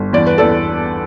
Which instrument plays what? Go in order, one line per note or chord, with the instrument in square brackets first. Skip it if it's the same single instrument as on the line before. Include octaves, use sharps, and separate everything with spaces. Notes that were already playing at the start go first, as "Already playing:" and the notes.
Already playing: [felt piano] G1
E2 D5
B4
E2 A4 D5